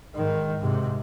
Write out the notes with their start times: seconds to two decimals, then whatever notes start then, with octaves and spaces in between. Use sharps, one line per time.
0.15 G#2 D#3
0.60 G#2 C3